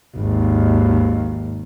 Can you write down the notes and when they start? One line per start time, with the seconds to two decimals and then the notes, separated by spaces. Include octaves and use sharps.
0.17 G#1 D#2